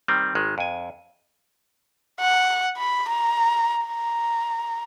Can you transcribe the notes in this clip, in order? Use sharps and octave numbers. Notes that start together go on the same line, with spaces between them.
D#3 G3 C4
G#1 D#3 G#3
F2 G#5
F#5
B5
A#5
A#5